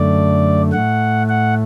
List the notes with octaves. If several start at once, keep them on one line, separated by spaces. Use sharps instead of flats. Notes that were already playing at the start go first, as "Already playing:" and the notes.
Already playing: F#2 D3 A3 D5
A2 A3 F#5
F#5